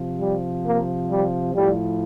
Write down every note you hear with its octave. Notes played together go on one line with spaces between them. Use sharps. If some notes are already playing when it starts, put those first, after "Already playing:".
Already playing: C3 F3
G3
A#3
G3
A2 F3 G3